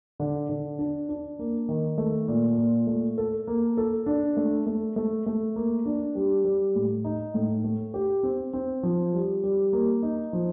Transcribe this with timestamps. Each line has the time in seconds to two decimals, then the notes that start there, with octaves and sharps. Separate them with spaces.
0.20 D3
0.49 D3
0.78 D4
1.09 D4
1.39 A#3
1.69 D#3
1.98 A3
2.28 A#2
2.58 A#2
2.87 A3
3.18 A4
3.47 A#3
3.77 A4
4.06 D4
4.37 A3
4.66 A3
4.96 A3
5.26 A3
5.56 A#3
5.86 D4
6.15 G3
6.45 G3
6.75 A2
7.04 D#4
7.34 A2
7.64 A3
7.94 G4
8.23 C4
8.53 C4
8.83 F3
9.13 G3
9.43 G3
9.73 A#3
10.03 D#4
10.33 F3